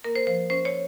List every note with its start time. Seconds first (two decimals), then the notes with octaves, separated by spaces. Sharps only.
0.04 A#3 A#4
0.15 C5
0.27 F3 C5
0.50 C#4 C5
0.65 C#5